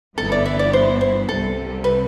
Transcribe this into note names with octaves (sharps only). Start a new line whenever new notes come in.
G1 G2 E3 B3 E4 A4
D5
E5
D5
C5
C5
C2 C3 G3 A4
B4